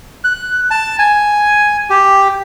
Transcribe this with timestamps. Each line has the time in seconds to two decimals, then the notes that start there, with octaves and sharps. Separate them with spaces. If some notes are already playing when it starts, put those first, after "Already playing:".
0.24 F#6
0.71 A5
0.99 G#5
1.90 G4